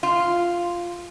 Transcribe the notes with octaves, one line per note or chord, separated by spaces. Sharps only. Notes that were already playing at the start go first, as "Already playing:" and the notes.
F4